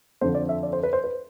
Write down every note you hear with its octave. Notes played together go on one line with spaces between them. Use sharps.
F2 D3 F3 C5
D5
E5
D5
C5
B4
C5
B4